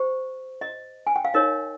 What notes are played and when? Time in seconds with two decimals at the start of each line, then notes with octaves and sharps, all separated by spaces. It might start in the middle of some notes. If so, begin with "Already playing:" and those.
Already playing: G4 C5
0.61 D#5
1.07 G#5
1.16 G5
1.25 F5
1.34 D#4 A#4 C#5 D#5